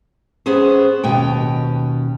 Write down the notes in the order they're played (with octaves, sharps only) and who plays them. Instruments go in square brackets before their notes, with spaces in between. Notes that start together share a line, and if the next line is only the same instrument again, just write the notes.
[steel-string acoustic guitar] B3 C#4 G#4 C5
D#2 B2 C#4 G5